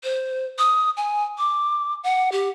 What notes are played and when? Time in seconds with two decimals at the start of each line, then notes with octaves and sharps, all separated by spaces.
0.04 C5
0.58 D#6
0.97 G#5
1.38 D6
2.04 F#5
2.32 G4